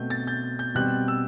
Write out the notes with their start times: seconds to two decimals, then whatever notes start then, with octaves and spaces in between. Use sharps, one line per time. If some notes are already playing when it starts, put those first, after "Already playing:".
Already playing: B2 A3 C4 G6
0.10 A6
0.27 G6
0.59 G6
0.75 B2 G3 C4 F#6
1.08 E6